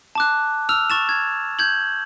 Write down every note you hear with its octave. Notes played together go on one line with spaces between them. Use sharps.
A5 D6 F#6
E6 F6 F7
C#6 A6 E7
G#6
G6 G#6 F#7